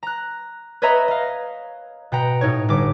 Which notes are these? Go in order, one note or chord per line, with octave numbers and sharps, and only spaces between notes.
A#5 F#6
B4 C#5 D#5 E5 A#5 B5
D#5 F5
B2 F#5 G5 A#5
A2 D#4 C#5
G1 D6